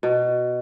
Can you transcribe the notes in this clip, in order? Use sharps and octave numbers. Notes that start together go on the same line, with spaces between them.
B2